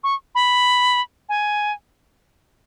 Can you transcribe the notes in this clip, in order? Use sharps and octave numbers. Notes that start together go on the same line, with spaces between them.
C#6
B5
G#5